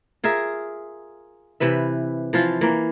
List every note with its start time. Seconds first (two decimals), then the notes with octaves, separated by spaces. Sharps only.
0.24 F4 G#4 A#4 E5
1.60 C3 E3 B4 E5
2.33 E3 F3 F4
2.61 E3 A#3